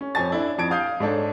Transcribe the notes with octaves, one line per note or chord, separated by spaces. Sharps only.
C#4
F2 C4 C#5 G#5 A5 A6
D4 E4
F2 A5 G#6 D7
F5 D#6 G6 C7
G#2 D4 A4 C#5